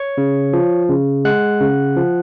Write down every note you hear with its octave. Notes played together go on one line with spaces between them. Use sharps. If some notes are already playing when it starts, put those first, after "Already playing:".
Already playing: C#5 C#6
C#3
F3
C#3
G#3 F#5 F#6
C#3
F3